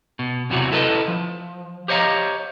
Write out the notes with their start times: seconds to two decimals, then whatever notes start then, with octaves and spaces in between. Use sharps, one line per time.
0.19 B2
0.50 E2 C3 E3 F#3 F#4
0.72 E4 A4 B4 D#5
1.08 F3
1.88 G4 C5 C#5 D#5 F5 A#5